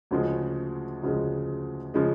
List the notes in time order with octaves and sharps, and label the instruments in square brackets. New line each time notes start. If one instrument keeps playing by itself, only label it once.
[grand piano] D2 C#3 F3 G#3
D2 C#3 F3 G#3
C#3 F3 G#3